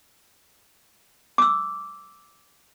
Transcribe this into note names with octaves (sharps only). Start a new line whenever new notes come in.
D6 E6